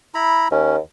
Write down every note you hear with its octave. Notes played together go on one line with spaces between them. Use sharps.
E4 A#5 B5
D#2 C#4